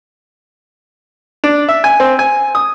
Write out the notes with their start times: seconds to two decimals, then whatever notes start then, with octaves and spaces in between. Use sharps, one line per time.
1.44 D4
1.69 E5
1.84 G#5
2.00 C4
2.19 G#5
2.55 D#6